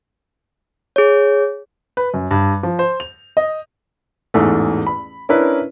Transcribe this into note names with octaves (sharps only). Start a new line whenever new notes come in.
G#4 C#5
B4
F#2
G2
F3
C5
F7
D#5
A1 E2 G#2 A3
B5
C#4 D4 E4 A#4 B4